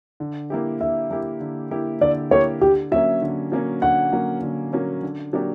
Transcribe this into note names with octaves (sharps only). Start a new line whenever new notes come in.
D3
A#3 E4 G4
D3 E5
A#3 E4 G4
D3
A#3 E4 G4
D3 D5
A#3 E4 G4 C#5
D3 G4
F#3 A#3 C#4 E5
D3
F#3 A#3 C#4
D3 F#5
F#3 A#3 C#4
D3
F#3 A#3 C#4
D3
F#3 A#3 D4 G4